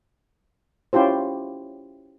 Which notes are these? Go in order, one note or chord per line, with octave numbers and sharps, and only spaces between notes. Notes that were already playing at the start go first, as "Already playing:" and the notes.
C#4 E4 F4 G4 C5